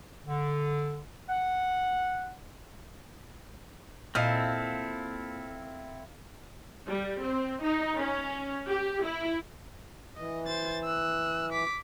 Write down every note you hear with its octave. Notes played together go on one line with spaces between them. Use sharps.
D3
F#5
A#2 C4 E4 A4 D#5 F5 F6
G3
C4
D#4
C#4
G4
E4
E3 D#5
C5 A6
E6 F#6
D6 B6